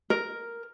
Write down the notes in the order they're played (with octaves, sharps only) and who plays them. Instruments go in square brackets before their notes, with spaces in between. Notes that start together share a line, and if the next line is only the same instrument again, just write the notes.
[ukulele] A#4